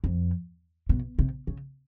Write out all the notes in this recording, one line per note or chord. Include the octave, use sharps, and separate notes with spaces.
F2
B2
C3
C#3